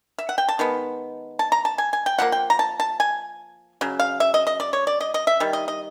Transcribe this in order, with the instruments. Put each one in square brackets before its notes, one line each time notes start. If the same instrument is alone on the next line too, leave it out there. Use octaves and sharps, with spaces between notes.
[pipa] E5
F#5
G5
A5
D#3 G#3 B3
A5
A#5
A5
G#5
G#5
G5
F3 A#3 F#5
G5
A#5
A5
A5
G#5
C#3 F#3
F5
E5
D#5
D#5
D5
C#5
D5
D#5
D#5
E5
D#3 G3
D#5
D#5